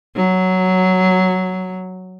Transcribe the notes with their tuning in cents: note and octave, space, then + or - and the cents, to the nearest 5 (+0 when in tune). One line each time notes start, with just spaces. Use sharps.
F#3 +5